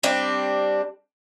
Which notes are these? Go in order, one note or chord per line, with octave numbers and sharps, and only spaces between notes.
G3 C4 D4